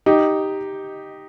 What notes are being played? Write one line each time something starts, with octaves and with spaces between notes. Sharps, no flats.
D#4 G4